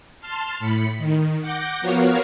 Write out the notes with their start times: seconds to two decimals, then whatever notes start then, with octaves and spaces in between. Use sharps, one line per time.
0.21 A5 C6 F6
0.60 A2 B5 C#7
0.98 D#3
1.41 F#5 D6 G6 A#6
1.81 F3 B3 F#4 A#4 C#5 F5